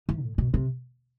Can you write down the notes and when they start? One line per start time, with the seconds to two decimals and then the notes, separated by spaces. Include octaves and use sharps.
0.09 E3
0.23 A2
0.38 B2
0.54 C3